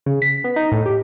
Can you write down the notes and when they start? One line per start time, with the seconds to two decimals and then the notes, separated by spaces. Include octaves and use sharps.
0.06 C#3
0.22 B6
0.44 B3
0.56 D#4
0.72 A2
0.86 G4